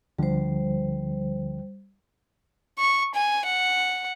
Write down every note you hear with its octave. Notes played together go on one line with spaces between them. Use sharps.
D2 D3 F3 G3 C5
C#6
G#5
F#5